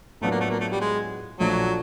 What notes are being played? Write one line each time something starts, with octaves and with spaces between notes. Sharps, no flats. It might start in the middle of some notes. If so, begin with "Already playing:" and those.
A2 F#3 A3 B3 D4 F4
A#3
A3
A#3
A3
G3
G#3
A#1 A#2 F3 F#3 A3 D4